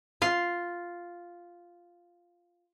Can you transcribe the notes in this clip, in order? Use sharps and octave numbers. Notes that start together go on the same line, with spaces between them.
F4 F5